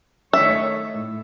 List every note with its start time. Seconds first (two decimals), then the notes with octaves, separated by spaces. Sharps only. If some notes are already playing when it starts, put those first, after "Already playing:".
0.33 D#3 A3 D#4 A4 C#5 E5
0.93 A2